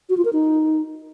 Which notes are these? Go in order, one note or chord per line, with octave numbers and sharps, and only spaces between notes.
F#4
F4
A#4
D#4